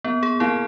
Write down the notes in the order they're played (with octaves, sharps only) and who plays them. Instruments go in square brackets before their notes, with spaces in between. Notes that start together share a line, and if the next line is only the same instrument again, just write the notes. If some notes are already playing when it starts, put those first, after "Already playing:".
[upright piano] A#3 [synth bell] B3
[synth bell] G#4
[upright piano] A#3 [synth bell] E4